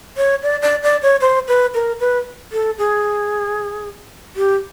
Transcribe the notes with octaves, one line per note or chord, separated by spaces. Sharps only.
C#5
D5
D5
D5
C#5
C5
B4
A#4
B4
A4
G#4
G4